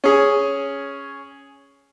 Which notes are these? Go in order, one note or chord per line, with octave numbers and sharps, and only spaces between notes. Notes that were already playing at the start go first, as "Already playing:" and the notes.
C#4 G#4